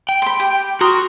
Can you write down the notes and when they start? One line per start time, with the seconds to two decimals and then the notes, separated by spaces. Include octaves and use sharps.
0.09 G5
0.22 B5 C6
0.40 G4
0.81 F#4 A#4 C6 D#6